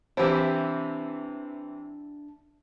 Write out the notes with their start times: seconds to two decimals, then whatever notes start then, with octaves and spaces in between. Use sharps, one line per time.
0.17 C3 E3 C4 D4 E4 G4 A5